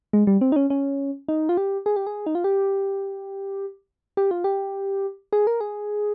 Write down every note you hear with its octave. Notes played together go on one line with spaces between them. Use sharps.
G#3
G3
C4
D#4
C#4
C#4
D#4
F4
G4
G#4
G4
G#4
D#4
F4
G4
G4
F4
G4
G#4
A#4
G#4